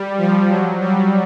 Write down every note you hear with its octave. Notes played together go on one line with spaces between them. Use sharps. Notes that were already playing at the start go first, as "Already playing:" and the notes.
Already playing: G3
F3
F#3
G3